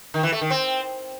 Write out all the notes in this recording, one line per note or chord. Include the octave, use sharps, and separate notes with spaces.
D#3
E3
A3
D#3
C4